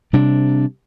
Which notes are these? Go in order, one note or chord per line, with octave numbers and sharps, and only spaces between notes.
C3 G3 D4